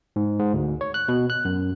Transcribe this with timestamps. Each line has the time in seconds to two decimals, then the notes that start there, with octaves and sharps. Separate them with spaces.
0.16 G#2
0.39 G#2
0.54 D2
0.81 C#5
0.94 F#6
1.08 B2
1.30 F#6
1.45 F#2